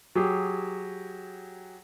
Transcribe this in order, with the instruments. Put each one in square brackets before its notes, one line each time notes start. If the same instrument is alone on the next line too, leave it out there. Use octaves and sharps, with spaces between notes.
[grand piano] F#3 G4 G#4